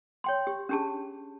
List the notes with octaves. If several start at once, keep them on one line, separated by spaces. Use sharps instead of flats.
C#5 G5 C6
G4
C#4 D4 G4 G#4 A5